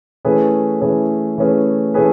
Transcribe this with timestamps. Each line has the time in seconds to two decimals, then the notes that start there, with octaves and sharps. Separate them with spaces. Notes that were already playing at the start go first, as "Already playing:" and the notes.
0.25 E3 A3 C#4 G#4 B4
0.81 E3 A3 C#4 G#4 B4
1.38 E3 A3 C#4 G#4 B4
1.94 E3 A3 C#4 G#4 B4